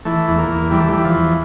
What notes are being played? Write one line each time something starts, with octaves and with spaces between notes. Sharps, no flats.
E3 A3
E2
A#3
E2
E3 G3
A3
E3 G3
F3
E2